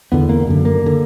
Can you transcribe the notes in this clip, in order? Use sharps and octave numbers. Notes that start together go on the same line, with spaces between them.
E2 D3 B3
A#3
F#2 D3
A#3
D3